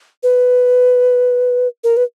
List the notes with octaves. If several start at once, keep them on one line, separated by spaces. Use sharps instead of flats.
B4
A#4
B4